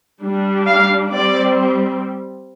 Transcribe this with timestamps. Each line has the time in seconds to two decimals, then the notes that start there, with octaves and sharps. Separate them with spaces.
0.21 G3 D4
0.66 F5
1.11 G3 C4 D5